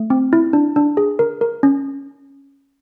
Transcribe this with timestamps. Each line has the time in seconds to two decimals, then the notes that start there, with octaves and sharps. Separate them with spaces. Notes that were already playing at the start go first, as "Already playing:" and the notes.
Already playing: A3
0.10 C4
0.33 E4
0.53 D4
0.76 D4
0.97 G#4
1.19 A#4
1.41 A#4
1.63 C#4